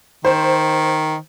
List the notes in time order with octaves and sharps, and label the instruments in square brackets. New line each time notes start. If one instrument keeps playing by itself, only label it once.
[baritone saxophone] D#3 [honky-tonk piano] C5